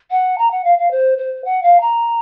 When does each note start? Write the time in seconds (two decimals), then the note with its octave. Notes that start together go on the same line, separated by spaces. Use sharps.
0.11 F#5
0.38 A#5
0.51 F#5
0.64 F5
0.78 F5
0.91 C5
1.18 C5
1.45 F#5
1.63 F5
1.81 A#5